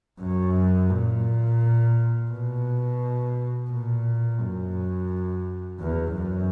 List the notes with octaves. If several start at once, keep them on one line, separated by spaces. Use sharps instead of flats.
F#2
A#2
B2
A#2
F#2
E2
F#2